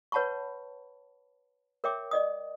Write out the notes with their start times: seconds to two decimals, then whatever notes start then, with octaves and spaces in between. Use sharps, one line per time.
0.12 B4 C#5 F#5 A5 B5 C#6
1.84 A#4 C#5 E5 G5 D6
2.11 D5 D#5 D#6